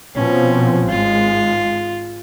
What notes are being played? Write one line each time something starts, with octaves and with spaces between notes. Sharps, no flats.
B2 F3 C4 C#4
G#1 G#3 F4